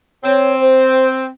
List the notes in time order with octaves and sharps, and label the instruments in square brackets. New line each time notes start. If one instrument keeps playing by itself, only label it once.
[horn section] C4 [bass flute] C#5
[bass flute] C5